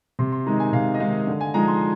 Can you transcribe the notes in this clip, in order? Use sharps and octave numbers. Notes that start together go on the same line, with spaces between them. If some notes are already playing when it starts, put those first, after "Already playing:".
C3 C6
C6
D#3 G#3 D#4 A#5
G#5
C3 F5
D#5
D#3 G#3 D#4 F5
D3
G#5
F3 G#3 D#4 A#5
C6